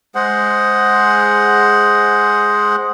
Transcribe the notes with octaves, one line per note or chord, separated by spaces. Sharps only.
G#3 G#4 C5 F#5